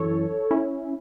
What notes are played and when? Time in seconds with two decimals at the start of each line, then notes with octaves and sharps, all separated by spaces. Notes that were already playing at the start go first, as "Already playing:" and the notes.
Already playing: F#2 E3 A4 C#5
0.51 C#4 E4